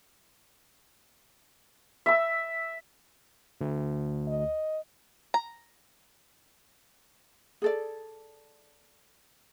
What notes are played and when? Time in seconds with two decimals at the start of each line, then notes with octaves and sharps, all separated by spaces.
2.06 E5 E6
3.61 D2
4.28 D#5
5.34 A#5
7.62 G#4 A4 D5